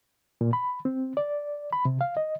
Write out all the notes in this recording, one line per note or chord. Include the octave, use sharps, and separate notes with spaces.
A#2
B5
C4
D5
B5
C3
F5
D#5